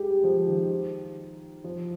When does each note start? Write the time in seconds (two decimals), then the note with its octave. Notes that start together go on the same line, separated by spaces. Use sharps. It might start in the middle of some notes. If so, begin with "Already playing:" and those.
Already playing: G#3 G4
0.08 G3
0.24 F3
0.47 D#3
1.64 F3